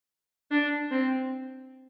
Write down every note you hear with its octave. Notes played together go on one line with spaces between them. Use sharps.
D4
C4